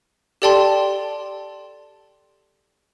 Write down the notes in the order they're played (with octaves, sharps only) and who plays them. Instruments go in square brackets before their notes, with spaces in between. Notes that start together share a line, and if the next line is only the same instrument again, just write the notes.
[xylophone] G4 A4 D5 G5 A5 C6